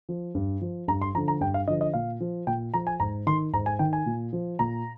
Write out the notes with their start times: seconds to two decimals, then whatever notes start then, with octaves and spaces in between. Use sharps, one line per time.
0.09 F3
0.35 G2
0.61 F3
0.88 G2 A#5
1.02 C6
1.15 F3 A#5
1.18 D3
1.28 A#5
1.41 G2 G5
1.54 F5
1.67 D3 D#5
1.70 F3
1.81 D#5
1.94 A#2 F5
2.20 F3
2.47 A#2 G5
2.74 F3 A#5
2.87 G#5
3.00 G#2 A#5
3.27 D#3 C6
3.53 G#2 A#5
3.66 G#5
3.79 D#3 G5
3.93 G#5
4.06 A#2
4.33 F3
4.59 A#2 A#5